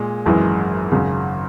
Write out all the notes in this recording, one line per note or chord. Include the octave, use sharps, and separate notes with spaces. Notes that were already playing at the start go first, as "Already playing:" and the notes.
Already playing: A#2 G#3
G#1 F#2 E3 G#3
G#1 F#2 C#3